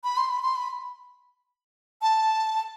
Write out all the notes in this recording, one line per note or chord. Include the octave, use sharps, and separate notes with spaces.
B5
C6
B5
C6
B5
A5